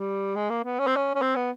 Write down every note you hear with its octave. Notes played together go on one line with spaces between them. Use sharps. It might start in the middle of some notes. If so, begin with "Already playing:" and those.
Already playing: G3
G#3
A#3
B3
C#4
C4
C#4
C#4
C4
B3